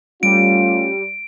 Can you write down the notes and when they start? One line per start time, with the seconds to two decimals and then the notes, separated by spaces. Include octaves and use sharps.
0.23 G3 A3 C#4 F4 D7